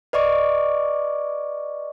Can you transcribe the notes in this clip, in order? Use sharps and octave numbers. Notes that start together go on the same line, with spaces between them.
B4 D5 D#5 C#6 D6